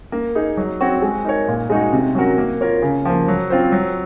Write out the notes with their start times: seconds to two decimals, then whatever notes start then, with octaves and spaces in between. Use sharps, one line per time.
0.12 A#3
0.35 D#4 G#4
0.57 F#3
0.81 C4 F#4 C#5
1.02 G#3
1.25 D#4 A#4 C#5
1.48 A#2
1.70 G#3 D#4 F#4
1.92 C3
2.15 F#3 C#4 F#4 A#4
2.38 A#3
2.61 F4 A#4 C#5
2.82 C#3
3.05 F3 A#3
3.28 F#3
3.50 C4 F4 C5
3.72 F#3